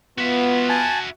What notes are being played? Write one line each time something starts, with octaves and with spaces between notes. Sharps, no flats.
B3 F4 F#4 E5
G#5 A5